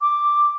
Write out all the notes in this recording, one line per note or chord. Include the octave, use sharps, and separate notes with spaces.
D6